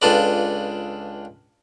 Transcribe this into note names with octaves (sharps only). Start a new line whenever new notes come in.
C#2 D4 F4 A4 B4 D5